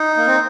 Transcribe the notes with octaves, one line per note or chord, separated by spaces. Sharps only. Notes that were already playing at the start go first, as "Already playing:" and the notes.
Already playing: D#4
A#3
C4